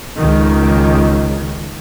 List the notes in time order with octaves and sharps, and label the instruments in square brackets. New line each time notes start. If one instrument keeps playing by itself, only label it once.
[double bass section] C#2 D#3